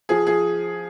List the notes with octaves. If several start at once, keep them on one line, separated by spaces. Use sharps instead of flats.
F3 G#4
F3 G#4